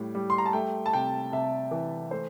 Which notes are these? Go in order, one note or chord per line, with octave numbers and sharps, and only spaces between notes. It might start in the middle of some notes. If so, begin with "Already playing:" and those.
Already playing: A2 G3
G3
C6
A#5
A5
A3 G5
A5
C3 G5
C3 E5
E3
A3 C5